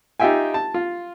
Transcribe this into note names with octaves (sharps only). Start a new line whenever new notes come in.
D#4 F4 G4 E5 G5 G#5
A5
F4